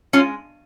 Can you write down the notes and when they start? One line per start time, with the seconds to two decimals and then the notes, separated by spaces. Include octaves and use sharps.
0.13 G#3 C#4 F4